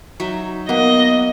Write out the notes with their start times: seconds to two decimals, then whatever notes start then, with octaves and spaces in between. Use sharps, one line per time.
0.20 F#3 D#4 E5
0.69 A#3 B3 D#5 F#5